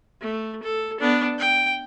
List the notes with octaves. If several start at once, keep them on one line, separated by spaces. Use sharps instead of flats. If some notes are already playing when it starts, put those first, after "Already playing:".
A3
A4
B3 D4
G5